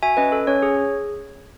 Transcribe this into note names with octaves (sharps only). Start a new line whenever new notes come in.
F#4 E5 G#5
C#4 B4 D#5
A4
C#4 C#5
G#4
G#4